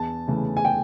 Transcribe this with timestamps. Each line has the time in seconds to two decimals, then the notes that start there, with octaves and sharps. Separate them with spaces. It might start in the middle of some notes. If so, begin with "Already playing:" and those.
Already playing: E2 A5
0.28 C#3 E3 A3
0.57 G#5
0.65 G5